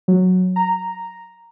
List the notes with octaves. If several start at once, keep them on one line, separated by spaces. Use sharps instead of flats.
F#3
A#5